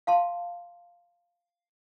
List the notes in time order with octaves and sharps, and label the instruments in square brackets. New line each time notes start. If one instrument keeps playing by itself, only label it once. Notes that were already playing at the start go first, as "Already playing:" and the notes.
[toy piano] F5 A5 C6